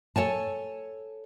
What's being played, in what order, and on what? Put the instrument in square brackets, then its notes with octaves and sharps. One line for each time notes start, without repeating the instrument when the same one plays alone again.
[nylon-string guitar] A4 C#5 G#5 A5